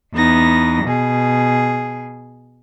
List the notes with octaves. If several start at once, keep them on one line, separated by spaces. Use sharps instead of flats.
E2 B3 D#4 A#6
B2 G#4